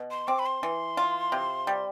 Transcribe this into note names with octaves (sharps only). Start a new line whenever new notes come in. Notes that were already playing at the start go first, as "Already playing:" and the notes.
Already playing: B2
C6
C4 D6
B5
C6
E3
F4
C3
G3